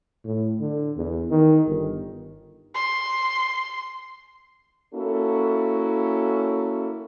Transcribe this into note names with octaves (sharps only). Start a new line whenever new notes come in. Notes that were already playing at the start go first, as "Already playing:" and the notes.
A2
D3
E2
D#3
G1
C6
A#3 C#4 E4 F#4 A4